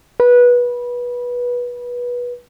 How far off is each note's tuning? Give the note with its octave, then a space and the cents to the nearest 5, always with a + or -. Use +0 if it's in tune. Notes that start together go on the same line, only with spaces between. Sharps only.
B4 -20